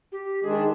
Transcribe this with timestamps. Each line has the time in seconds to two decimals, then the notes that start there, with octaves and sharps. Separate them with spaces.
0.12 G4
0.43 D#3 G#3 D4 G#4